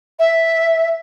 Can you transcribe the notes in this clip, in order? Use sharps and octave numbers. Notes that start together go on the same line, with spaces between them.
E5